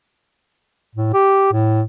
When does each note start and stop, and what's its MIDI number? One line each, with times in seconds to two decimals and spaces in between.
0.95 1.11 45
1.14 1.51 67
1.52 1.82 45